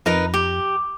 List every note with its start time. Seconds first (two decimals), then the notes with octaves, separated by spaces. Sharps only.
0.06 F2 D#4 A#4 B4
0.34 G4